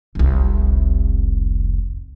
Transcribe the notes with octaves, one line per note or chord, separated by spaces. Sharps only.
F1 C2